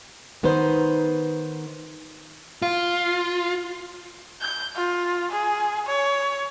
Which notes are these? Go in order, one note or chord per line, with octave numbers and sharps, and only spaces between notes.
D#3 B3 D#4 B4 C5
F4
G6
F4
G#4
C#5